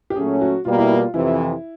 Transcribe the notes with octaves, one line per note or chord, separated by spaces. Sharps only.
G4
A#2 F#3 A3 C#4 G#4
F#4
B2 G3 A#3 F4
E4
F4
F2 C3 E3 E4